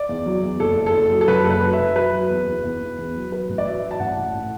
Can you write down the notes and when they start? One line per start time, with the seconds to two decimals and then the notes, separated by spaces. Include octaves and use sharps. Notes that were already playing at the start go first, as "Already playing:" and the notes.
Already playing: D5
0.09 E2
0.26 F#3
0.43 E2
0.60 F#1 A4
0.77 F#1
0.86 A4
0.94 F#1
1.11 F#3
1.21 A4
1.28 F#2 B4
1.45 F#1 A4
1.50 B4
1.62 F#3
1.73 E5
1.79 F#2
1.96 F#3 B4
2.13 F#3
2.30 E2
2.46 E2
2.64 E2
2.81 E2
2.98 E2
3.15 F#3
3.32 F#3 B4
3.49 A1
3.58 D5
3.66 F#3 E5
3.83 F#3
3.91 A5
3.99 A1 F#5
4.17 A1
4.33 A2